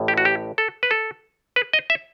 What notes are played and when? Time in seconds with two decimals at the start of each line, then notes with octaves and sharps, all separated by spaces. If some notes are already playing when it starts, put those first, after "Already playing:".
Already playing: A1 A2
0.08 G4
0.18 F#4
0.25 G4
0.58 A4
0.83 B4
0.91 A4
1.56 B4
1.73 D#5
1.90 E5